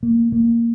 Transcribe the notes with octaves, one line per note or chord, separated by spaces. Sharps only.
A#3
A#3